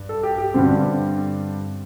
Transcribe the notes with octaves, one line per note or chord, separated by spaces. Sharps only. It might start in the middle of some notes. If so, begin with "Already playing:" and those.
Already playing: G2
A4
G4
G4
G2 D3 G3 C4